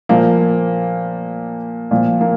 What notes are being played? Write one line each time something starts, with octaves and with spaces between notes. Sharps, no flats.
A#2 F3 A#3
A#2 F3
A#3